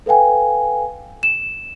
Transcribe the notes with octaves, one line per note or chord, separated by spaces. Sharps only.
A4 B4 F5 G5 G#5
E7